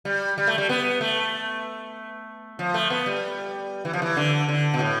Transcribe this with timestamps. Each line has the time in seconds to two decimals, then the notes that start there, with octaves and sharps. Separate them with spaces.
0.05 G3
0.38 G3
0.47 A3
0.58 G3
0.69 B3
1.01 A3
2.59 F3
2.74 A3
2.90 B3
3.06 G3
3.85 E3
3.93 F3
4.02 E3
4.16 D3
4.48 D3
4.74 B2
4.79 A2